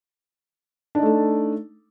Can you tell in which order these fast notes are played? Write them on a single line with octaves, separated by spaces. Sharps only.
D4 D#4 A3 A4